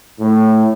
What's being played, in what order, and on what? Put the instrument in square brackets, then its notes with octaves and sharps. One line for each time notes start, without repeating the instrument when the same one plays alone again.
[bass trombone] A2